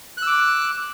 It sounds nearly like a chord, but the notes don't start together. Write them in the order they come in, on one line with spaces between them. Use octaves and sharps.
F#6 E6 D6